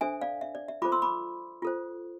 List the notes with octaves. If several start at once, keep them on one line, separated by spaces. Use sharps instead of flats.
D4 A4 C5 E5 G#5
D5 F5
E5
D5
E5
F4 A4 C5 B5 D6
C6 E6
B5 D6
F4 A4 C5